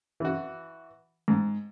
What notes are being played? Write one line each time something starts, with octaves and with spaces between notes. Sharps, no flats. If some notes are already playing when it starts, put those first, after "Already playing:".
E3 F#4
G#2